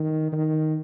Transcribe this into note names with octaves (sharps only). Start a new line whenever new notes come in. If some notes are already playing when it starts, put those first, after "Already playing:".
Already playing: D#3
D#3